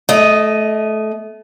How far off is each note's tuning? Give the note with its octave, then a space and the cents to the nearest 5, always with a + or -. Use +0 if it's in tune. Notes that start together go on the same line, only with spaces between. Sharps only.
A3 -25 D#5 +0